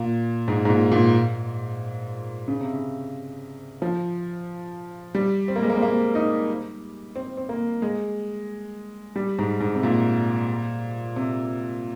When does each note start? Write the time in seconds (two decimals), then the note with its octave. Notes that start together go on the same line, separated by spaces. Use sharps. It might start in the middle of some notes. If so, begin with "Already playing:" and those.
Already playing: A#2
0.48 G#2
0.65 G#2
0.70 A#2
0.92 A#2
2.48 C#3
2.61 C3
2.73 C#3
3.82 F3
5.15 G3
5.48 C4
5.56 A#3
5.63 G#3
5.70 A#3
5.77 C4
5.82 A#3
6.15 D#4
7.16 C4
7.37 C4
7.49 A#3
7.82 G#3
9.16 G3
9.38 G#2
9.60 G#2
9.75 C3
9.83 A#2
11.16 C3